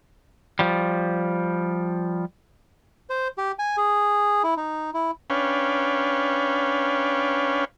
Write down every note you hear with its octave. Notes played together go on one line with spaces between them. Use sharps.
F3 G3
C5
G4
G#5
G#4
E4
D#4
E4
C#4 D4 B4 C#5 F5 G5